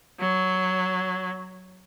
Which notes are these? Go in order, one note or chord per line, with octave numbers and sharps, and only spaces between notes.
F#3